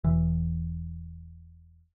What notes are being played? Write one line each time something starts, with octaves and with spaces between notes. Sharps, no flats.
E1 E3